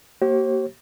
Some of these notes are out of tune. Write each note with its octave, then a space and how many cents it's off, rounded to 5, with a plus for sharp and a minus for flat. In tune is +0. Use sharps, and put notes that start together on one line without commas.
A#3 +0 G4 -40 C5 +45